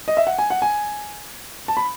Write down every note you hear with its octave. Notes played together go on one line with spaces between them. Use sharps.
D#5
E5
F#5
G#5
F#5
G#5
A5
B5